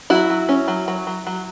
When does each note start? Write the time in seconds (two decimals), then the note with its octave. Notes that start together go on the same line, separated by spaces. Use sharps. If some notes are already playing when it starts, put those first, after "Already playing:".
0.10 F#3 E4 F#4
0.30 F#3
0.49 C#4
0.68 F#3
0.88 F#3
1.07 F#3
1.27 F#3